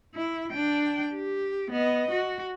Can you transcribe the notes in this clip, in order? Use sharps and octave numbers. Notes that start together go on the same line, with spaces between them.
E4
D4 G5
G4
B3 D#5
F#4